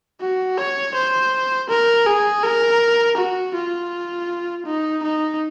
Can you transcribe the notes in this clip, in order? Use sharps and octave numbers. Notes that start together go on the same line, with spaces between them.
F#4
C#5
C5
A#4
G#4
A#4
F#4
F4
D#4
D#4